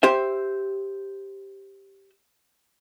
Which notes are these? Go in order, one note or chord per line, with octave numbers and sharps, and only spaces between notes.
G4 C5 E5